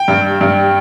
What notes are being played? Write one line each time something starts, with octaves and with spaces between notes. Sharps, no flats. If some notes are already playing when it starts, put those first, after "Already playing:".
Already playing: G5
G2
G2